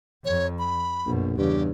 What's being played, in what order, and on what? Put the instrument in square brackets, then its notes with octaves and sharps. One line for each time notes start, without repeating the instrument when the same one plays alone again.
[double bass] F2 [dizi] C#5
[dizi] B5
[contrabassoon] A#1 [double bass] F#2 B2
[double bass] E2 C#3 [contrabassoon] G2 [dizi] G4